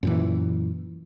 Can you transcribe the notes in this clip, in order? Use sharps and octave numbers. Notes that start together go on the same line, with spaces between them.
F#2 A#2 E3